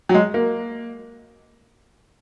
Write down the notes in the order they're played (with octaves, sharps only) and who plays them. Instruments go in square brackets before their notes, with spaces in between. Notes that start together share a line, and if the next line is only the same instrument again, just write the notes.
[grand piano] F#3
G#3
A#3